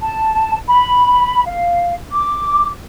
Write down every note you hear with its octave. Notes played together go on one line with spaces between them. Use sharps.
A5
B5
F5
D6